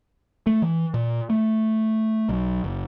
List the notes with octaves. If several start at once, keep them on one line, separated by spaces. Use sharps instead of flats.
A3
E3
A#2
A3
B1
F#1